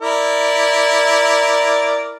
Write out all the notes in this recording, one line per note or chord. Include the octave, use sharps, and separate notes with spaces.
E4 A#4 D5